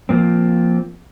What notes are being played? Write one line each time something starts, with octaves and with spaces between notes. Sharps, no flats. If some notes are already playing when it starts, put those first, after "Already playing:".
F3 A#3 C4